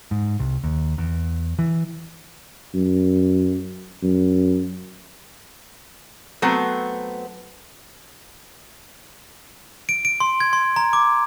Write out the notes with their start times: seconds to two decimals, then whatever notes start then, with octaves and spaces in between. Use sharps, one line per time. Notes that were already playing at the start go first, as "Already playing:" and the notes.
0.11 G#2
0.39 C2
0.64 D#2
0.98 E2
1.59 E3
2.74 F#2
4.02 F#2
6.42 F#3 A3 B3 C4
9.89 D7
10.05 D7
10.20 C6
10.40 G#6
10.53 C6
10.76 A#5
10.93 D6